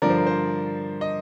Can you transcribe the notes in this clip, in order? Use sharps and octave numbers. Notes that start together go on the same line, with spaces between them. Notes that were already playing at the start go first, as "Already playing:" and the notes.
G2 D3 F3 A#4 D5
C5
A#4
C5
D#5